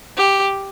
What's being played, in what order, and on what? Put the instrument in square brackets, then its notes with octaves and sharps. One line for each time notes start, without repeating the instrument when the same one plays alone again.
[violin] G4